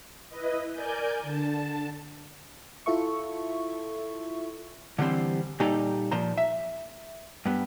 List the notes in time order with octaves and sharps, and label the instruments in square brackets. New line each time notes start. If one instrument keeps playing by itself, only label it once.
[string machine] E4 B4 D#5
A#4 D5 G#5 G6
D3 A5
[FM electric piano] E4 F4 A4 E5 C#6
[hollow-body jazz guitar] D3 E3 G3 C4 C5
A#2 G3 D#4 G4 A4
A#2 F3 C5 A#5
E5
G2 B3